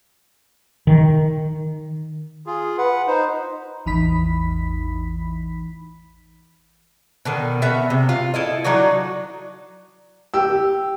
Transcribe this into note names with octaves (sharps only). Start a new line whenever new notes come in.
D#3
F4 G#4
B4 F#5
D#4 C5
A1 E2 E3 D#4 B5 B6
B2 D3 D#3
B3 F#4 E5 F5
C3
F4
E4 A4 D#5
F#3 D4 D#4 F#4
G4 E6